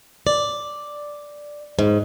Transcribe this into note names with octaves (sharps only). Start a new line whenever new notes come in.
D5
G#2